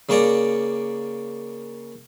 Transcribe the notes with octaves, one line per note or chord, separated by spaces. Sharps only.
C#3 A#3 C#5 D5 A#5